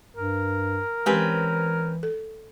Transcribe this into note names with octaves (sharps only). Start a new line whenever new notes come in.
G2 A#4
E3 G#3 C4 C#4 G4 B4 G#5
A4